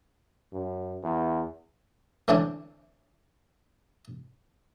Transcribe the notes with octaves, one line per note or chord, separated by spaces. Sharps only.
F#2
E2
D3 E3 C4 D4 C#5 D6